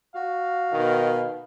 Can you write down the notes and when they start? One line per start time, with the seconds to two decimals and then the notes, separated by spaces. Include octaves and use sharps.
0.15 F#4 F5
0.72 B2 D#3